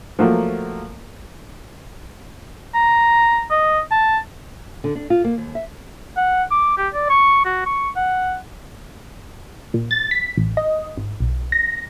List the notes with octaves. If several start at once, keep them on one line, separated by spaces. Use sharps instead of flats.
F3 F#3 A3 A#3
A#5
D#5
A5
D3
D4
F4
A#3
D#2
E5
F#5
D6
G4
D5
C#6
F#4
C#6
F#5
A#2
A6
B6
A1
D#5
G#1
B1
A#6